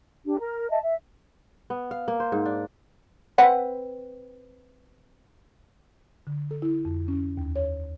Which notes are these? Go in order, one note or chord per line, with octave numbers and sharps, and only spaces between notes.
D4 G4
A#4 A#5
D#5 E5 A5
E5
B3
F5
A#3
C5
G#2
D4
C4 B4 F#5
D3
A4
E4
F2
C#4
D#2
C#5